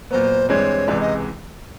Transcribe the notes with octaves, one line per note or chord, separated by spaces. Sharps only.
A#2 F#3 B3 C5
G2 E3 G#3 C4 C#5
C#2 C3 E3 G#3 D5
D#5